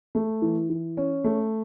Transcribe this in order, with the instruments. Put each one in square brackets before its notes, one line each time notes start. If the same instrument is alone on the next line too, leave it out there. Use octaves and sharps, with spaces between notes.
[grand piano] A3
E3
E3
C#4
A3